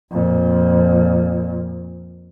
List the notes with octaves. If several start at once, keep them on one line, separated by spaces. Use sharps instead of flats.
F2 A#2